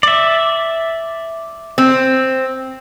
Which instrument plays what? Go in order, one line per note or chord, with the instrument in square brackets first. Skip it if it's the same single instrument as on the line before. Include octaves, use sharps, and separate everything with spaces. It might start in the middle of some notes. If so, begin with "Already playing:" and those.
[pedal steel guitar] D5 E5
[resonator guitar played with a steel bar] C4